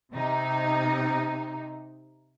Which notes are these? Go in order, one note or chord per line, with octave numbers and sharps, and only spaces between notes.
C3 D#4